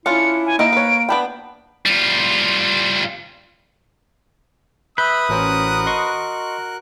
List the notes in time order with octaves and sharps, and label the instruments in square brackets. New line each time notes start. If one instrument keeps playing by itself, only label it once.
[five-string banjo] C#4 D4 F4 [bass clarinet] E4 [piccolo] C#7
[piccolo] G#5
[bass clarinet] A#3 [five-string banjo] D#4 E4 D#5 [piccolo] D7
[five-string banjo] B4 C#5
[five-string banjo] B3 D4 G5 [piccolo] B5
[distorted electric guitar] G3 F4
[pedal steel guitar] B4 [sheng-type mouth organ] E5 B5 [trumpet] D#6 [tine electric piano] G6
[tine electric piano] A1 C#4 C5 [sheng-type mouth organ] F#4 A#4 F#6
[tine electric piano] D#5 C6 C#6